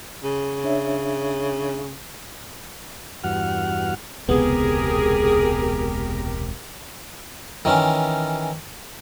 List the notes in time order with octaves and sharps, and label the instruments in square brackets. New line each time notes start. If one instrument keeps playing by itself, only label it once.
[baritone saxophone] C#3
[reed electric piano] D4 C#5 E5
[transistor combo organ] E2 G2 F#4 F#5 F6
[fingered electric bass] E1 C#2 C3 [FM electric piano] B3 [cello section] G4 A#4 [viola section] G#4
[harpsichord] D#3 E3 C#4